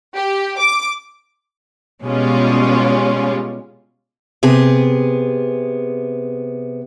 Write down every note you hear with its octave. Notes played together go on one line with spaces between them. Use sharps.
G4
D6
B2 G3 G#3 C#4 F4
C3 B3 G#4